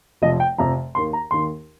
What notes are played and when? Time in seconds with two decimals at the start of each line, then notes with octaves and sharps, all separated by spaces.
0.22 F1 F2 C3 F3 D#5
0.40 G5
0.58 F1 F2 C3 F3 A#5
0.95 D#2 D#3 C6
1.13 A#5
1.31 D#2 D#3 C6